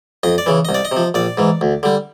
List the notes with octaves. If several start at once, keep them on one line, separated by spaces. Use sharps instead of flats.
F2 D#5
D5
C#3 E3
C2 D#5
D5
D#5
C3
F3
A#1 D5
G#2 E3
D2
D3 G3